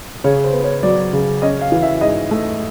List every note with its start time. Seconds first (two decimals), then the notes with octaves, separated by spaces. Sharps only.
0.24 C#3 C#5
0.44 C5
0.53 B3
0.64 C#5
0.83 F#3 D5
1.13 C#3
1.42 C#4 D#5
1.61 F5
1.72 E3
1.82 E5
2.01 G#2 D#5
2.31 A3